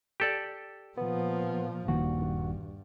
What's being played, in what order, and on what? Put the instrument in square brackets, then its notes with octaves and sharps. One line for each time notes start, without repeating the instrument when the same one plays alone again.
[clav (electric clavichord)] G4 A4 D5
[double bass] A#2 F3 [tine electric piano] B3
[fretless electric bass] D#1 D#3 A#3 [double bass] G2 [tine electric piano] F#4